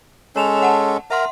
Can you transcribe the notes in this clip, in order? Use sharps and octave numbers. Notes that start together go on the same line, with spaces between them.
G#3 C#4 A4 C#5 E7 F7
F#5 A5
A#4 E5 F#5 A#5 C6